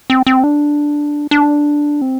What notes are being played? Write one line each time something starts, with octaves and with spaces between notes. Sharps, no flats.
C4
C4
D4
D4
C4